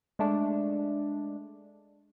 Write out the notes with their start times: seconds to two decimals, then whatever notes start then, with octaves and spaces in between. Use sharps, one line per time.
0.19 G#3 A3 D4